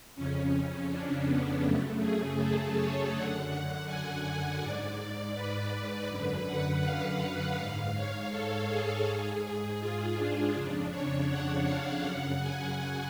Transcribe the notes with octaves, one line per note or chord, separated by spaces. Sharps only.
F2 C#3 C#4
D4
B3
F#2 C#3 A3
G#4
A4
C#5
F#2 D3 F#5
F#5
G#5
F#5
G#2 D5
B4
F#2 D3 B4
F#5
F5
F5
G#2 F5
C#5
A4
G#4
G#2
F4
D4
F2 C#3 D4
C#5
F#5
F5
F#2 C#3 F#5
G#5